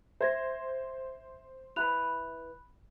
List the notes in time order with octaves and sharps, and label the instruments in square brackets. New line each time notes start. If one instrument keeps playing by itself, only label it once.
[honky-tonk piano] C5 [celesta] E5 G#6 A#6
[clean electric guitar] E4 B4 [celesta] B5 F#6 F7